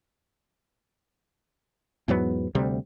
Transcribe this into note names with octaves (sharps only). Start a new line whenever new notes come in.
E2 G#2 F#3 B3
D2 C3 G3